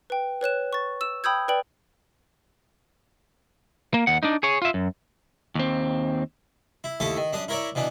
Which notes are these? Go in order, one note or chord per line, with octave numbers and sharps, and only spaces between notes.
B4 G5
B4 C#5 F#6 E7
C#6 A6
E6 E7
G5 B5 D#6 E6 G6 G#6
B4 D5 G5 F#7
A#3
D#2 F#5
D4 D#4
G#4 C#5
F4 E5
F#2
D#2 C4
E4
D#2 A3 E4 A4 D#6
D#3
F#2 D4 D#6
E4 A#4 C#5 D5 E5
B2 E3 D4